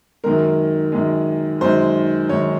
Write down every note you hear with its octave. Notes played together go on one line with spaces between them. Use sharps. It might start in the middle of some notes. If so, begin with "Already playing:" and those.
F#2 D#3 G#3 A#4
F#2 D#3 G#3
F#2 D#3 G#3 C5
F#2 D#3 G#3 C#5